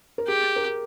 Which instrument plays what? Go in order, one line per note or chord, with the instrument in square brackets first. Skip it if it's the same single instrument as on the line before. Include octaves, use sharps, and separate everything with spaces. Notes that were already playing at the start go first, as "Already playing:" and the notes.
[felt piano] A#4
[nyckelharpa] G4 [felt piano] G#4
[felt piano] A#4